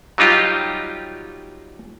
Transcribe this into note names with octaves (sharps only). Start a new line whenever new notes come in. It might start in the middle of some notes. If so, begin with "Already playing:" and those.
F#3 G3 D#4 F4 G4